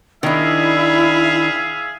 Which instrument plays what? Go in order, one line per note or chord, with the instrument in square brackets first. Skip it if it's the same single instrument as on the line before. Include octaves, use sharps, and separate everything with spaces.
[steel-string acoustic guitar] D#3 D4 [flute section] E4 [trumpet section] G#4 E5 F5